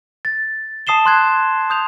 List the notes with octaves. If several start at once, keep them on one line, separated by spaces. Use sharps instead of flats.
A6
A5 D#6 C7 E7 G7
C6 F#6 G#6
D#6 G6 F7